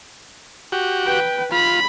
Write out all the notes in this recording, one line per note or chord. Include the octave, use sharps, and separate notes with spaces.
F#4 G4
B4 G5
F4 B5